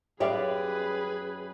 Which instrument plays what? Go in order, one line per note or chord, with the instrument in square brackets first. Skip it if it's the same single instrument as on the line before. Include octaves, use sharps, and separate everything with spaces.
[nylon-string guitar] F#2 G4 D5 [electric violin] G#4 B4 [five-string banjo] C#5 E5 F5